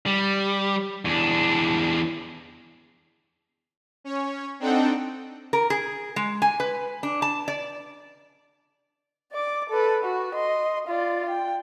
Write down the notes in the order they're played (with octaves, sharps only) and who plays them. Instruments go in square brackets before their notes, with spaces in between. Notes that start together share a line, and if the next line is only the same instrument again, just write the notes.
[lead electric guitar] G3
E2 D4
[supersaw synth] C#4 C#5
C4 D4 D#4 A4 F#5 G5
[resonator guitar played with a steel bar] A#4
G#4
G#3
G#5
B4
D4
A5
D5
[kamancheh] D5 D6
A4 B4
F#4
D#5 C6
F4 D5
G5